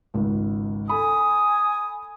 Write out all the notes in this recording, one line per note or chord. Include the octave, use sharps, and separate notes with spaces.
G#1 C#2
A4 G#5 B5 D#6